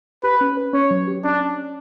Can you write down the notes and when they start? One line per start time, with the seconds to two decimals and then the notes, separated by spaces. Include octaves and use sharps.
0.23 G4 B4
0.41 C#4
0.57 B4
0.73 C#4 C#5
0.91 F#3
1.07 G4
1.24 C#4 D4
1.40 C#4
1.57 C#4